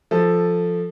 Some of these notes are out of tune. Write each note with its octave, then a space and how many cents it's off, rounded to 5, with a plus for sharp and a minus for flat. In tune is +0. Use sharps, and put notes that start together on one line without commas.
F3 +0 A4 +0